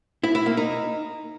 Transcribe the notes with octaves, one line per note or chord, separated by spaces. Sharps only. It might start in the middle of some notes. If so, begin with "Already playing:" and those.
E4
E4
A#3
D#4